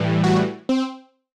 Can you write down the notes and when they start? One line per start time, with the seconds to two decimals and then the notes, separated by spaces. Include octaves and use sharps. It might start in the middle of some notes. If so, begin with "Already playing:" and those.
Already playing: A2 E3 G3
0.24 F#4
0.69 C4